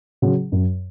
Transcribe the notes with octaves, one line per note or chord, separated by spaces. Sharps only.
C#3 F#3
F#2